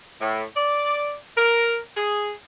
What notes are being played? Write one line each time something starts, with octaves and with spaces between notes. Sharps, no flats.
A2
D5
A#4
G#4